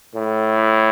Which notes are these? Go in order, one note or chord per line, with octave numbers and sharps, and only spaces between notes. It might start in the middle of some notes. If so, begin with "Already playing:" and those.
A2